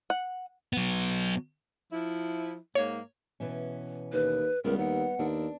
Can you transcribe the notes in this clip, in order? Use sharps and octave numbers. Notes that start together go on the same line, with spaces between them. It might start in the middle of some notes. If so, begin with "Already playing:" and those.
F#5
F#3 B3
F3 E4
G#2 A#3 C#5
B2 E3 C#4
D#2 B4
C#2 G3 B3 A#4
D#2 F#5
D#2 D4